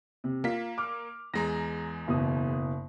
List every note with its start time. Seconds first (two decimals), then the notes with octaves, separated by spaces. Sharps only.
0.24 C3
0.44 A#3 F4 B6
0.78 D6 F6
1.34 E2 G#3 A#5 A#6
2.07 F#1 B2 D#6